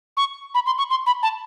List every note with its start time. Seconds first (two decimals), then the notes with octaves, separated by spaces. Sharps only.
0.17 C#6
0.54 B5
0.66 C6
0.78 C#6
0.90 C6
1.06 B5
1.23 A5